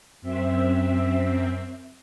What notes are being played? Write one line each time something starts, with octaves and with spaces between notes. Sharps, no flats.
F#2 C4 E5